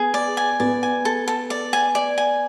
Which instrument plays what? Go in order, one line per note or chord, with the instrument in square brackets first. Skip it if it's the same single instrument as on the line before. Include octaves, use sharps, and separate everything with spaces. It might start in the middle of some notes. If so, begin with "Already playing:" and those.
Already playing: [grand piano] B3 [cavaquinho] G#4
[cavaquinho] D5
G#5
[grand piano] B3 [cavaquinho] D5
[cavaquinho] G#5
A4
A4
D5
G#5
D5
G#5